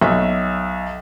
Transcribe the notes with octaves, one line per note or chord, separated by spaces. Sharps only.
B1 E5